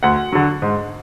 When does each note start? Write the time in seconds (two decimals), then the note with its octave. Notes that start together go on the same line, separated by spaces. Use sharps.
0.03 D2 F#5
0.32 D3 F#3
0.62 G#2